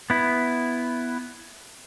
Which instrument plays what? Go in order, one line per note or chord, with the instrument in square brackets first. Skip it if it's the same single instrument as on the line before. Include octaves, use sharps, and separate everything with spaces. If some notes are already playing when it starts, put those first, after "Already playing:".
[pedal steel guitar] B3 E4